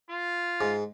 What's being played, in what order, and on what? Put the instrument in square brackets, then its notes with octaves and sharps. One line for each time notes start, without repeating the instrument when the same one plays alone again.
[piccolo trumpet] F4
[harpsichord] G#2